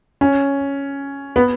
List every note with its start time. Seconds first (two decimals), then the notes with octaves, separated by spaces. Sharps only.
0.21 C#4
1.36 B3